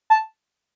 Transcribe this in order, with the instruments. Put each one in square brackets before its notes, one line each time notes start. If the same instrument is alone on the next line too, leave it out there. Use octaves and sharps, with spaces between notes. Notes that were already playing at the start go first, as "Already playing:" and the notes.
[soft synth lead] A5